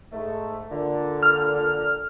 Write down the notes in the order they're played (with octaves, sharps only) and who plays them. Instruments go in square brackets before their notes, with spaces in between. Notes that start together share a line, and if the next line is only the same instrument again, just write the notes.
[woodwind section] G#2 A3
A#2 D3
[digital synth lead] F6